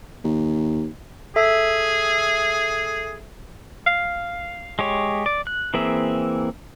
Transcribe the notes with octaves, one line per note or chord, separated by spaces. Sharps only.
D#2
G#4 A4 E5 E6
F5
G#3 G4 C#5
D5
F#6
E3 A#3 C4 G#4 E5